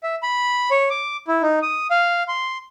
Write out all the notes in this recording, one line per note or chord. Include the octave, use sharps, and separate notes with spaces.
E5
B5
C#5
D6
E4
D#4
D#6
F5
C6